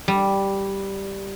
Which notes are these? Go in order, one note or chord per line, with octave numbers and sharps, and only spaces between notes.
G3